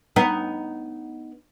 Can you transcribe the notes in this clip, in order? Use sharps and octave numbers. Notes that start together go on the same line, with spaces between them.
B3 D#4